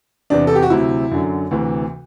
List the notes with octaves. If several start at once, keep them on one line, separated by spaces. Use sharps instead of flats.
E2 C3 E3 D4
A4
G4
F#4
D2 C3 F#3 E4
F#2 D3 F#3
D2 C3 E3